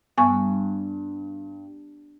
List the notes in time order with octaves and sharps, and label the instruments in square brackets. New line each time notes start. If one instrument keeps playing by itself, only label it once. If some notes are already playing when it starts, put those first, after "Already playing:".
[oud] G2 [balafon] B3 G#5 C#6